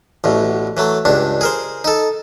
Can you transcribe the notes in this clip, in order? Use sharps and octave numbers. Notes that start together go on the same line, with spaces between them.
A1 E2 B2
E3 F#3 A3
C#2 G2 D4
G#4 A#4 C5
D#4 A4